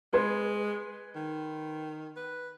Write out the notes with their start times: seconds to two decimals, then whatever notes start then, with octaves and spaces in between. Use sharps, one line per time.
0.13 G#3 B4 C6 G#6
1.15 D#3
2.16 B4